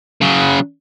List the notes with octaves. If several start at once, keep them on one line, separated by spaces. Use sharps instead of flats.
C#3 F#3